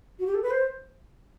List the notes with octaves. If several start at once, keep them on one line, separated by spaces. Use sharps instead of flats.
F#4
G4
A4
B4
C5